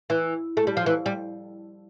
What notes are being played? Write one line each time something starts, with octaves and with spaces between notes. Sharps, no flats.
E3
A3
G3
F3
E3
G3